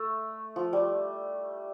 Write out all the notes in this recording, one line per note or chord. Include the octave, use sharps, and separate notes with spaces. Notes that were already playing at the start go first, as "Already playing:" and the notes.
Already playing: A3
F3
G3